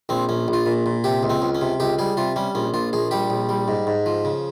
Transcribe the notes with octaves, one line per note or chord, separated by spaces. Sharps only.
A#1 C4
A#1 C#4
A#1
F4
A#2
A#2
C3 G4
C#2
C4
C#2
C#4
C3
C#2 G4
G3 G#4
C3 F4
G3 C#4
A#1 C#4
A#1 F4
A#1 G#4
G3 G4
A#1
G3
G#2
G#2
F3
C#3